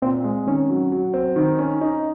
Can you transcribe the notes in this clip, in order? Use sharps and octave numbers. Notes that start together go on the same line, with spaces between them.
A#2 C4
G#3
D#3 C#4
F#3
F#3
C4
D#3 D#4
C#4
D#4